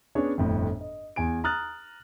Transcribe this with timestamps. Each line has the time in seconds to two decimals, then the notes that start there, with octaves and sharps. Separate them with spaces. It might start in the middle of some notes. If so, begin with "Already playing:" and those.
0.15 B3 C#4 D4 G#4 C#5
0.38 G1 F2 A2
0.81 D#5
1.16 E2 G#5 D7
1.44 A#5 D#6 F6 F#6 A6